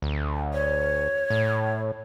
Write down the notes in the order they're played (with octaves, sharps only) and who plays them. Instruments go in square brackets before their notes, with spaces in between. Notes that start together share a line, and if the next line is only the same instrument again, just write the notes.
[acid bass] D2
[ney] C#5
[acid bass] A2